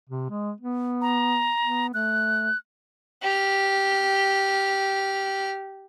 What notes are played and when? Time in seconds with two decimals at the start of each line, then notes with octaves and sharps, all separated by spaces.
0.10 C3
0.30 G#3
0.61 B3
1.02 A#5
1.62 B3
1.94 A3 F#6
3.22 G4 F6